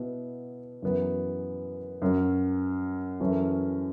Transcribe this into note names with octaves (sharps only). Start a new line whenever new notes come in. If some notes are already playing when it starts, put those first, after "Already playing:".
Already playing: B2 B3 E4
F#2 E3 B3
F#2 F#3 C#4
F#2 E3 C#4 A4